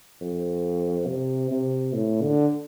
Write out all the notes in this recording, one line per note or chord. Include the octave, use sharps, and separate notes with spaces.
F2
C3
C3
A2
D3